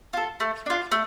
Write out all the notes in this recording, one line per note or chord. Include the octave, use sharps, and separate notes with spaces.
F4 A4
A3
D4 F4
A3